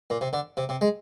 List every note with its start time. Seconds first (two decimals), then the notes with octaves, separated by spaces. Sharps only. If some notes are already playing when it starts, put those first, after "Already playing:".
0.10 A#2
0.21 C3
0.33 D3
0.57 C3
0.69 C3
0.81 G#3